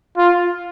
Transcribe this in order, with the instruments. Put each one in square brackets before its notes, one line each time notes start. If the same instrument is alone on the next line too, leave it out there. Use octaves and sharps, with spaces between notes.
[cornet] F4